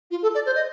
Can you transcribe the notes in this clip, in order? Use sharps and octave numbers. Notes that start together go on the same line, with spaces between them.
F4
A4
D5
C5
D#5